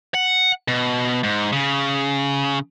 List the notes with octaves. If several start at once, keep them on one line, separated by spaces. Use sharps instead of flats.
F#5
B2
G#2
C#3